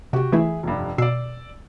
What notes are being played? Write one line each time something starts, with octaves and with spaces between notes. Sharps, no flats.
C3 F#4 G4
E3 A3 E4 G#4 E5
F1 G2
B2 D5 E6 C7